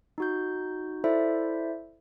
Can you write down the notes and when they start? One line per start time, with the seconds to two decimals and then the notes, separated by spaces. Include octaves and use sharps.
0.18 D#4 F#4 G6
1.04 E4 A4 C5 D5 E5